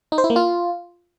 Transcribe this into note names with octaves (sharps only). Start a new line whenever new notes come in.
D#4
C5
E4
A#3
F4